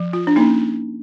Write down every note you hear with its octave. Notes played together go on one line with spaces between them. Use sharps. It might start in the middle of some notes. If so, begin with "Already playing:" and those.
Already playing: F3
F4
D4
A#3 C#4 D#4